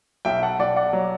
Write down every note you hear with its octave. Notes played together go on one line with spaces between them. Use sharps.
B1 E5 G5
F#5 A5
B1 D5 F#5
D5 F#5
F#3